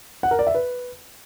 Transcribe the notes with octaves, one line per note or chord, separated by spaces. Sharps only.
F#5
A#4
D5
E5
B4